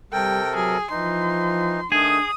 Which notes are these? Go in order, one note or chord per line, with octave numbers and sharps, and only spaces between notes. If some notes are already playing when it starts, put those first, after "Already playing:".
C3 G3 A4 A#4 G5
F#3 G#4
E3 F3 D#4 C6
D#3 A3 D4 G#4 D#6